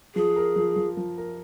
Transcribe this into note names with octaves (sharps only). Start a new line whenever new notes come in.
F3 G#4
A#4
F3
F3
F3
A#4